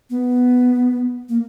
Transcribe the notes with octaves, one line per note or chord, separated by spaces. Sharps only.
B3
A#3